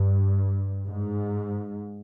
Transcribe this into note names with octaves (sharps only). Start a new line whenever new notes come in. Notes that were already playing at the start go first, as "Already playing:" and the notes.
Already playing: G2
G#2